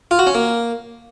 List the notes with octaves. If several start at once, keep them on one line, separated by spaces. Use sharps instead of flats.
F4
F#4
C#4
A#3